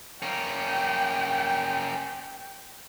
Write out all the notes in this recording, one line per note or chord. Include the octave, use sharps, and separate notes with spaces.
A#3 C#4 G5